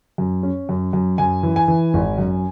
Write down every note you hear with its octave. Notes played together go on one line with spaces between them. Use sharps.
F#2
C#4
F#2
F#2
F#2 G#5
E3
G#5
E3
G#1
F#2